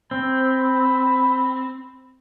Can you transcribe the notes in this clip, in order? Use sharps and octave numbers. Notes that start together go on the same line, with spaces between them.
C4 B5